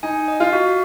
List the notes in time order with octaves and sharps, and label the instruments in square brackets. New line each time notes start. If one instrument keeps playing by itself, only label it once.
[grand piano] D#4 [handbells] G#5
[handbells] D#5
[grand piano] F4
[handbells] F#4